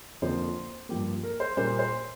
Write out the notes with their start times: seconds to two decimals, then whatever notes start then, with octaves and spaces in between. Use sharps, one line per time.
0.22 F2 D3 F3 A#3 C5
0.89 G2 F3 A#3 G4
1.24 A#4
1.40 C5
1.57 A#2 G3 A#3 C5
1.79 C5